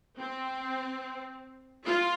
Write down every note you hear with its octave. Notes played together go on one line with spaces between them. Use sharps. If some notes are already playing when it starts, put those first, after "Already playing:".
C4
F4